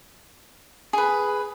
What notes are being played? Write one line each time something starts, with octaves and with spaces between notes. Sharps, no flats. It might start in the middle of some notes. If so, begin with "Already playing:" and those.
G#4 B4